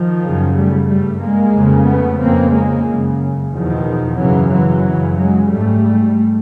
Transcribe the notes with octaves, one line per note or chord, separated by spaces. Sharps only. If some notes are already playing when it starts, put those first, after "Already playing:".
Already playing: D#3 F3
F#2 C#3
G3 A3
G2 G3 A3
G#3 A#3
F2 C#3
A3 B3
F2 C#3 A#3 C4
G#3 A#3
F#2 C#3
E2 B2 D#3 F3
F#2 C#3 E3 F#3
E3 F#3
F#2 C#3
F#3 G#3
G#2 G3 A3